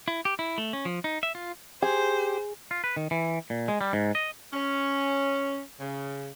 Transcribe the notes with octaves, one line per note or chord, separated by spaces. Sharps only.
E4
G4
E4
A3
C#4
F3
D#4
E5
F4
G4 G#4 C5
F4
B4
D#3
E3
A#2
G#3
G3
G#2
D#5
C#4
C#3